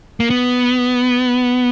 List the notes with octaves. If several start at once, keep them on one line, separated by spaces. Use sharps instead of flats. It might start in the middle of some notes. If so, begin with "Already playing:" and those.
A#3
B3